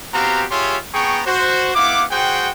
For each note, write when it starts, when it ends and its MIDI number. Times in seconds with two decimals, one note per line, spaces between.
0.14 0.44 59
0.14 0.44 60
0.14 0.44 66
0.14 0.44 67
0.14 0.44 77
0.14 0.44 82
0.51 0.78 65
0.51 0.78 67
0.51 0.78 68
0.51 0.78 73
0.51 0.78 76
0.51 0.78 84
0.94 1.21 59
0.94 1.21 68
0.94 1.21 79
0.94 1.21 82
0.94 1.21 85
1.26 1.72 66
1.26 1.72 72
1.75 2.04 59
1.75 2.04 64
1.75 2.04 77
1.75 2.04 78
1.75 2.04 86
2.11 2.50 66
2.11 2.50 68
2.11 2.50 72
2.11 2.50 78
2.11 2.50 79